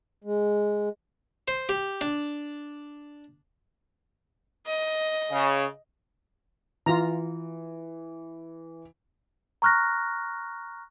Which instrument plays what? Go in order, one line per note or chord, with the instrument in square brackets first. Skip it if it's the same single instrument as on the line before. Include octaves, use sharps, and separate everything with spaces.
[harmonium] G#3
[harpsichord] C5
G4
D4
[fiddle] D#5
[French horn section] C#3
[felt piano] E3 [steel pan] F4 A#5
[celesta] A#5 C#6 F6 F#6 A#6